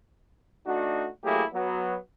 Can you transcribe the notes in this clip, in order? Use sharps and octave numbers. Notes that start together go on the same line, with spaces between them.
A3 D4 D#4 F#4
F#3 A3 A#3 E4 G4 G#4
F#3 B3